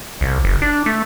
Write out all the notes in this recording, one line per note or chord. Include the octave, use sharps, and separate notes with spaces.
C2
F#1
D4
A3